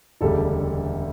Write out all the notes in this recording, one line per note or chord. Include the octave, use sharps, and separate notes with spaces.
E1 D2 C#3 G3 A4